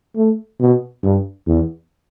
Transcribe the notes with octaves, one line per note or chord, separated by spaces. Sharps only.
A3
B2
G2
E2